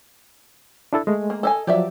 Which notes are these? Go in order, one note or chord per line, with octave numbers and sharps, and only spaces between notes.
D4 E4 A4
G#3 A3
A#3
A4 D#5 G#5
F3 F#3 G4 D5 E5